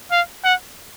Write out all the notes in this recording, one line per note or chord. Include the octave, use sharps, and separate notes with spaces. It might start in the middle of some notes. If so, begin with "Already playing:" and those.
F5
F#5